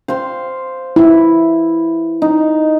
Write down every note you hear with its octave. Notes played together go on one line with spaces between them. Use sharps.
C5 F5 C6
E4
D#4